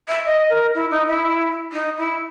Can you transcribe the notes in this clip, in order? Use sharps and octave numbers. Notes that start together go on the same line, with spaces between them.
E5
D#5
A#4
E4
D#4
E4
D#4
E4